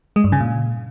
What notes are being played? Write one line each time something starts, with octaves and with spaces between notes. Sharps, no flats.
G#3
G2
C#3
A#2